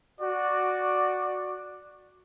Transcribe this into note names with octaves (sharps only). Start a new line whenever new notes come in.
F#4 D5